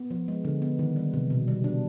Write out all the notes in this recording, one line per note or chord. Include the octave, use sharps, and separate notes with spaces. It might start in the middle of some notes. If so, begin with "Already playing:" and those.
Already playing: B3
F3
G#3
D3
B3
D#3
G3
C3
B2
G3
D4